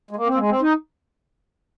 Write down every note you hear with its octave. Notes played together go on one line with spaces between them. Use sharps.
G#3
A#3
C4
A#3
G#3
C4
D#4